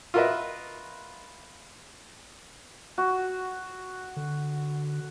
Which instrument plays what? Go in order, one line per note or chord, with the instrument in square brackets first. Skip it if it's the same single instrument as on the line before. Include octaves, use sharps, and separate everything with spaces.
[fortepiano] F4 F#4 A#4 B4 D#5 E5
[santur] F#4
[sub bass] D3